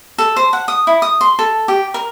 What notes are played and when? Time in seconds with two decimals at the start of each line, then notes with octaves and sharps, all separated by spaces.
0.18 A4
0.36 C5
0.53 F#5
0.68 D#6
0.87 E4
1.02 D#6
1.21 C6
1.39 A4
1.68 G4
1.94 A#4